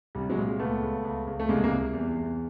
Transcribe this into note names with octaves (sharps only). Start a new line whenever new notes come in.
C2 G3
F#3 G#3
A#2
C#2 A3 B3
C#2
C#2
C#2
A3
C2 G#3 A#3
G#3 A#3
C2
E2
E2